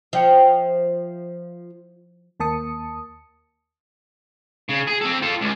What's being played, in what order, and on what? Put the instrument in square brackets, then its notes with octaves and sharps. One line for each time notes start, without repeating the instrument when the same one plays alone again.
[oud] F3 [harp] E5 G5 C#7
[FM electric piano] D#2 A#3 A5 D#6 C#7
[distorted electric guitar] C#3
G#4
C4 A4
F4 A4
C#2